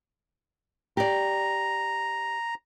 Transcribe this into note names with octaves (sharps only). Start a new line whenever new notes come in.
G4 D5 A#5